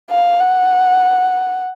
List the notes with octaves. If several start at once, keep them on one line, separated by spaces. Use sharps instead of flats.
F5
F#5